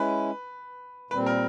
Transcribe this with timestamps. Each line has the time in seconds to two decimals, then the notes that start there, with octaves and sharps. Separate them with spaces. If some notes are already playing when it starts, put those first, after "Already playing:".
Already playing: G#3 C#4 E4 B4
1.11 A#2 G3 C4 B4
1.26 A#4